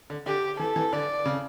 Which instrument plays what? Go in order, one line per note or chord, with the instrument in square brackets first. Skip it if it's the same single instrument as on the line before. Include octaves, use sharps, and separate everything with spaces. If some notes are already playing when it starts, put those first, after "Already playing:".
[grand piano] D3
[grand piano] D3 [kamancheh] G4
[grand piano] E3 [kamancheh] A4
[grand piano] E3
[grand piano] D3 [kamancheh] D5
[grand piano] C#3